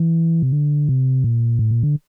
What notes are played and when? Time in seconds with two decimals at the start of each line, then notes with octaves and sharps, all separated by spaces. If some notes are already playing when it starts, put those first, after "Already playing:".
Already playing: E3
0.42 C3
0.52 D3
0.89 C3
1.24 A#2
1.59 A2
1.71 A#2
1.83 D3